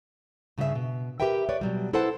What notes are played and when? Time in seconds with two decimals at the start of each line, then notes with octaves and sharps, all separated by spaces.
0.58 G2 C#3 C#4 G4 E5
0.75 B2
1.20 G4 A#4 B4 E5 G5
1.49 B4 C#5 D5
1.61 B2 F#3 G3
1.93 E4 A4 B4 C5 F#5 A5